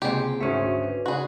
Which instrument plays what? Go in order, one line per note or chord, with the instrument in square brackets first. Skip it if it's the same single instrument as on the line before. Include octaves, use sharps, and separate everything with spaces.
[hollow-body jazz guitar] C#2 C3 [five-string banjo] G#3 G4 [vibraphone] A#3 G#4 F#5
[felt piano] G#1 D2 G#4 [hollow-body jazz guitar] A3 C#4 [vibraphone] F#4 C5 E5
[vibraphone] B4
[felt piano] C#3 B5 [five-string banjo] F#4 G#4 [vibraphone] D5